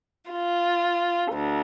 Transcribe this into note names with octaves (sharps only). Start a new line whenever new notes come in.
F4
D2